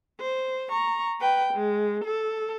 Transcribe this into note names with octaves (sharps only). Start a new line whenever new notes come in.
C5
A#5 C#6
B4 G5
G#3
A4